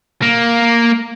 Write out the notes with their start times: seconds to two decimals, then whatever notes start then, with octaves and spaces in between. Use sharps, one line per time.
0.23 A#3